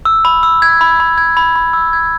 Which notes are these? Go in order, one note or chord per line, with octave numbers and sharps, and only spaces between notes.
E6
B5
E6
G#6
B5
B5
G#6
B5
B5
E6
G#6